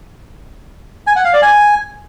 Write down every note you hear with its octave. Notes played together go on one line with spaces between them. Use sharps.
G#5
F#5
F5
D5
G#5